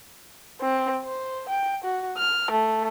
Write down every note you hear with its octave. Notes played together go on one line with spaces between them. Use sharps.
C4
C5
G5
F#4
F6
A3